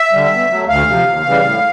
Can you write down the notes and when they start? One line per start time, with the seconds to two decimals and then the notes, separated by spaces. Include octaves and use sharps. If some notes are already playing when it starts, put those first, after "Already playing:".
Already playing: E5
0.12 D3 G3
0.32 B2
0.50 F#3 A3
0.69 D2 F5
0.88 C3 F3
1.07 D#2
1.26 C#3 E3 G3
1.44 A2